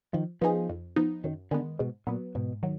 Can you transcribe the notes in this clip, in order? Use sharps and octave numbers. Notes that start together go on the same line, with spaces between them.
D#3 F3
F3 B3 D#4 G#4
F2
F3 B3 D#4
F#2 D#3
D3 D#3 G#3 B3
G#2 B2
A#2 F#3 B3
G#2 B2
D#3 F#3